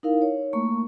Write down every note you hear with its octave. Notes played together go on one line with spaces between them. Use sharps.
D#4 E4 A#4 F5
C#5
A3 A#3 C#6